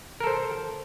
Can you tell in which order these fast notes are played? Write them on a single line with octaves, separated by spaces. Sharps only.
A#4 A4 C5